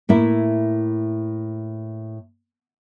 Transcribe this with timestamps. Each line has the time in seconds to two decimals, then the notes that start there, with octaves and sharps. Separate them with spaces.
0.09 A2 A#3 E4